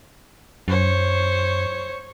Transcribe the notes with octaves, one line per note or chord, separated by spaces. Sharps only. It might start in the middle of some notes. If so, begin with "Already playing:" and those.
F#2 C5 C#5